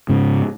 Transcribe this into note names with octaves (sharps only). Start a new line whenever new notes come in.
G#2 C#3